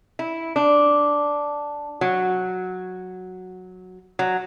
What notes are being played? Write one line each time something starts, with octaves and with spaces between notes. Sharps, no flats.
E4
D4
F#3
F#3